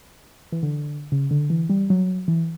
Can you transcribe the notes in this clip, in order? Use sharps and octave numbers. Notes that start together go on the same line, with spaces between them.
E3
D3
C#3
D3
E3
G3
F#3
E3